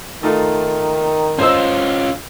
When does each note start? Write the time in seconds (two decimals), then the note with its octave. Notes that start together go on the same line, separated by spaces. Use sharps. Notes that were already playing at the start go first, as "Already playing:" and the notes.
0.23 D#3 A3 D#4 F4
1.39 C#4 F4 C5 D#5 E6